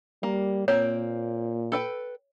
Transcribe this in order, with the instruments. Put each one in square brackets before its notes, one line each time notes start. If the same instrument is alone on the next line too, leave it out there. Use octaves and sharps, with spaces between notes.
[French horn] G3 [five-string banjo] A#3
[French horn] A#2 [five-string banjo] A#3 C4 [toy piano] C#5
[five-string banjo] A4 B4 G5